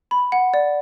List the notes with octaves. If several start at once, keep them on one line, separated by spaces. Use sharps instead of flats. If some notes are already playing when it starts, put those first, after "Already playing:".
B5
F#5
D5